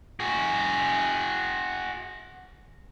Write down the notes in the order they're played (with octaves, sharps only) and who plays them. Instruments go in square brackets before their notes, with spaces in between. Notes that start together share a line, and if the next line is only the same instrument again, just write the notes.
[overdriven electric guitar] F#4 G#4